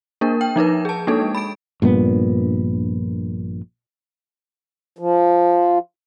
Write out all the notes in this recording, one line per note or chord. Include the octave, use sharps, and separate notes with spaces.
A#3 D4 A#4
G5
F3 D#4 A#4 B4
G#4 A5
G#3 A#3 D4 D#4 A4
B5 D7
A#1 G2 A#2 B3
F3